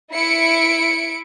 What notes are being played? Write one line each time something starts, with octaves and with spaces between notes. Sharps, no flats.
E4 C#7 D7